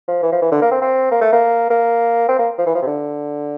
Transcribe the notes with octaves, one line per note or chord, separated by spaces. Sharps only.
F3
E3
F3
E3
D3
A#3
C4
C4
A#3
A3
A#3
A#3
C4
A#3
F3
E3
F3
C3
D3